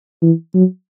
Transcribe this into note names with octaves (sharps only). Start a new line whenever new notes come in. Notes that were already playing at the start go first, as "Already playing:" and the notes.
E3
F#3